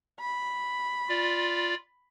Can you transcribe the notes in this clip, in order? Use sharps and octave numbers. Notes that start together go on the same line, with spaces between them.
B5
F4 D5